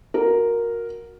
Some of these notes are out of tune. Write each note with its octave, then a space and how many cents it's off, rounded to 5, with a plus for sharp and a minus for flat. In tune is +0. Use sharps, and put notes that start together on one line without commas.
F#4 -20 A#4 +0